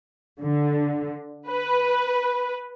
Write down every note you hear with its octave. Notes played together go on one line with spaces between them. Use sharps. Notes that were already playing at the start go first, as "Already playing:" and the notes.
D3
B4